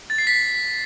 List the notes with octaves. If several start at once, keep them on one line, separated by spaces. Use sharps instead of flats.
A6
C7
B6